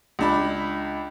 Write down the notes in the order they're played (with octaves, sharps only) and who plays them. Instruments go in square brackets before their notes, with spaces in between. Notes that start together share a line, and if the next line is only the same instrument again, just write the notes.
[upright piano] C#2 D4 B5